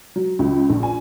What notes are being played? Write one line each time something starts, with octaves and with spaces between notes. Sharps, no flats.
F#3
C#2
A#1
G#5